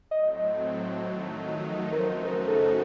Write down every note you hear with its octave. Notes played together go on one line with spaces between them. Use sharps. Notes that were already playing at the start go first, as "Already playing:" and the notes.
A2 F#3 A3 C4 D#5
F2 D#3 F#3 A3 D#4
A#4
F#2 C#3 A3 D#4 F#4 C5
A#4
A4